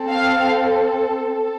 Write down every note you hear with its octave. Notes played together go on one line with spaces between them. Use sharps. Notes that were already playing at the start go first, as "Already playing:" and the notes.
Already playing: C4 A4
F5
A4